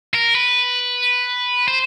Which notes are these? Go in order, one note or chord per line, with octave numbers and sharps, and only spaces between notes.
A#4
B4
C5